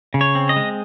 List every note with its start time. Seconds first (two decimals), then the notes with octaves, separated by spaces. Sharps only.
0.14 C#3
0.21 C#5
0.35 C4
0.49 D#5
0.56 G#3